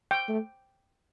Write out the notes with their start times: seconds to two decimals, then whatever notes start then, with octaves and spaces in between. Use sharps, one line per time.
0.11 G5
0.28 A3